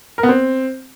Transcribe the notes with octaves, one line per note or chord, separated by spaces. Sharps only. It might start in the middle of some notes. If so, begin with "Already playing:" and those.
A#4
B3
C4